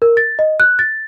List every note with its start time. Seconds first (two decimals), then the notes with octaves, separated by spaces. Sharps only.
0.02 A#4
0.17 A6
0.39 D#5
0.60 F#6
0.79 A6